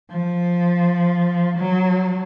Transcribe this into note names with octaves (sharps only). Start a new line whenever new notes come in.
F3
F#3